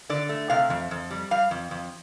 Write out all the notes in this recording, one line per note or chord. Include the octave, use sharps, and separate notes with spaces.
D3 D5
A3
C3 F5
F2
F2
G3
G3 F5
F2
F2